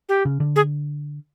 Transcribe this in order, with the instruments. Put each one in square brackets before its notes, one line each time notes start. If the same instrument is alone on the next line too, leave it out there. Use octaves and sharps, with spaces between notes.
[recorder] G4
[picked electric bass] C#3
D3
[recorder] G#4